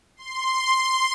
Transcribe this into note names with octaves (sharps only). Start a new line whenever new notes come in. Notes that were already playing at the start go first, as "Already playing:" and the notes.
C6